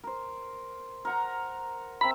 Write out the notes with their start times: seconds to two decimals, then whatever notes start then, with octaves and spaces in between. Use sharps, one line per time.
0.04 A#4 C5
1.05 A#4 F#5 A#5
2.01 C4 E5 A#5 B5